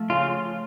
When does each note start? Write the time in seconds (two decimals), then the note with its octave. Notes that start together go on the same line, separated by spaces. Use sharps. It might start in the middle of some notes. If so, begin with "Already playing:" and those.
Already playing: F3 A3
0.10 C#3 F4